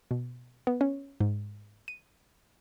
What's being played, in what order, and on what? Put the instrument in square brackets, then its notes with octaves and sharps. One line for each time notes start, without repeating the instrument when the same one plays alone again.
[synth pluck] B2
B3
C#4
G#2
D#7